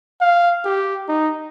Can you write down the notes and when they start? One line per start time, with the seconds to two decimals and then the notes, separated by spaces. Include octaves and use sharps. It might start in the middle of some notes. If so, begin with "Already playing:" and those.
0.21 F5
0.65 G4
1.08 D#4